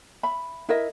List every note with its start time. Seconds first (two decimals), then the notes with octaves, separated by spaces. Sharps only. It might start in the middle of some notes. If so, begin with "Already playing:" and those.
0.23 E5 B5
0.69 E4 A#4 D#5 E5